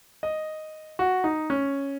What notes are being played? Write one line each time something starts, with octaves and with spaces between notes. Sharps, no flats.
D#5
F#4
D#4
C#4